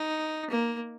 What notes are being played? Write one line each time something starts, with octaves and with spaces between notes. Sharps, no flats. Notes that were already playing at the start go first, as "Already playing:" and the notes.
Already playing: D#4
A#3